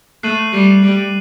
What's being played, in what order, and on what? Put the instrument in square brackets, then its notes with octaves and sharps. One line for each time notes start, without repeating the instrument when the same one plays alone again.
[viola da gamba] A3 [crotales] F#6 C7 D#7 F#7
[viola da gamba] G3
G3